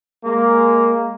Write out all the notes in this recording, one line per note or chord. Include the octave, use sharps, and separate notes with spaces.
G#3 A#3